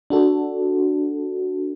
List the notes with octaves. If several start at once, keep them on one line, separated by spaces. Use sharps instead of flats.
D4 F#4 A4